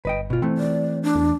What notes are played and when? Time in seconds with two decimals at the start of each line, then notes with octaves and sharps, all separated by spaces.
0.05 G1 B4 D#5 G5
0.30 B2 F4
0.42 E3 A3 C4
0.58 D5
1.03 D4
1.15 E2